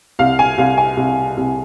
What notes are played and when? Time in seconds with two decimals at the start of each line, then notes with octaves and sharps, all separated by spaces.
0.19 C2 F5
0.39 G#5
0.58 C2 F5
0.78 G#5
0.97 C2
1.37 C2